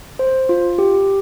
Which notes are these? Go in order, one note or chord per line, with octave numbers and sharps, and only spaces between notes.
C5
F4
G4